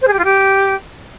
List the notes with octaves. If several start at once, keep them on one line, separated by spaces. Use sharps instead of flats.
C5
G#4
G4
F4
G4